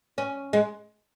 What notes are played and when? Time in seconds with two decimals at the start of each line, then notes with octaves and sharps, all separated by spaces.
0.18 C#4
0.53 G#3